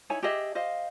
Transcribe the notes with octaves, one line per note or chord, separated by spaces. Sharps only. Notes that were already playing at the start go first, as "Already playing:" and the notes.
D#4 E4 C#5 G#5
G4 G#4 D#5 E5
C5 D#5 F5